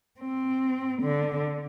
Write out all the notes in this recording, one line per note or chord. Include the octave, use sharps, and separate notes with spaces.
C4
D3